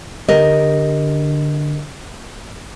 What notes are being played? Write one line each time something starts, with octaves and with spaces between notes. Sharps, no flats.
D3 G4 A#4 D#5